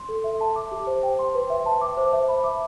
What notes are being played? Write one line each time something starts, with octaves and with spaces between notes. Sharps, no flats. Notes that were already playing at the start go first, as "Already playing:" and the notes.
Already playing: C6
A4
E5
A5
D6
G4
C5
G5
C6
B4
E5
A5
D6
C5
E5
B5
D6